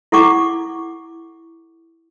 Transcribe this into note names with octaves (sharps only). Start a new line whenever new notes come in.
E4 A4 F#5 C#6 D6